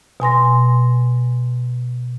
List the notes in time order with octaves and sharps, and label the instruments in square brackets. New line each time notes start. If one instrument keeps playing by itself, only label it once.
[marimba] B2 G#5 C6 A#6